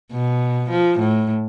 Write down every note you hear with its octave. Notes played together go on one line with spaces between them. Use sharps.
B2
F3
A2